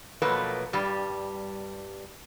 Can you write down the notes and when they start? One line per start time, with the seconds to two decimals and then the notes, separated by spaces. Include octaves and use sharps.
0.22 B2 F3 F#3 A3 A#3 B4
0.73 G2 G3